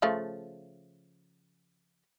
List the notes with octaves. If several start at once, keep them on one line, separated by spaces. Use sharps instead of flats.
C#3 F3 A3